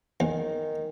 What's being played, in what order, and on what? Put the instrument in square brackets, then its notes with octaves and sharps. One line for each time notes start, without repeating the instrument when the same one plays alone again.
[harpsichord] E2 [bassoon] D#3